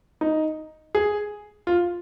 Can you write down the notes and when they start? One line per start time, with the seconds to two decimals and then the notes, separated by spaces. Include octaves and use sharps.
0.21 D#4
0.95 G#4
1.67 F4